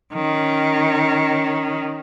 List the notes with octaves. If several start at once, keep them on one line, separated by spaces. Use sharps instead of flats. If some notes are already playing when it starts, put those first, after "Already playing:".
D#3 C#4